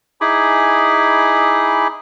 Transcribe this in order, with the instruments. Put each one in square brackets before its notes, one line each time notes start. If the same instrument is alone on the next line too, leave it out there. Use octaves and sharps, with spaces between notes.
[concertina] D#4 E4 G#4 G#5 B5 D6